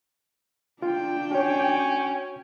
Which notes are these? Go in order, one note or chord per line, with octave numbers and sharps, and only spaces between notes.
D4 F4 G5
C#4 F#4 C#5